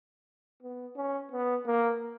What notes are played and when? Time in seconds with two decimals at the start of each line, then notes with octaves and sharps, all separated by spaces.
0.62 B3
0.96 C#4
1.32 B3
1.66 A#3